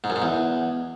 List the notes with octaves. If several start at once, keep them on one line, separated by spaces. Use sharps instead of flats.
G#2
F#2
G#2
E2